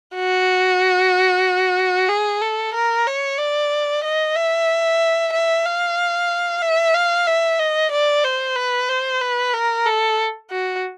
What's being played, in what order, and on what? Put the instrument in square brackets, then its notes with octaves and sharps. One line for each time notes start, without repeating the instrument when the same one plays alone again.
[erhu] F#4
G#4
A4
A#4
C#5
D5
D#5
E5
E5
F5
E5
F5
E5
D#5
D5
C5
B4
C5
B4
A#4
A4
F#4